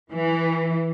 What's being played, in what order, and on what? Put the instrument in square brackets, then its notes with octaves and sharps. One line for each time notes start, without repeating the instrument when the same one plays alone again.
[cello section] E3